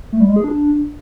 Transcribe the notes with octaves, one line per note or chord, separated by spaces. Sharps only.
A3
G3
G#3
G#4
D4